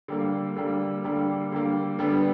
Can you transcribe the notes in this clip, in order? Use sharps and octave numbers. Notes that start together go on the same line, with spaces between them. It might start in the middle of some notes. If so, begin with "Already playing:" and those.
D3 G3 A#3
D3 G3 A#3
D3 G3 A#3
D3 G3 A#3
D3 G3 B3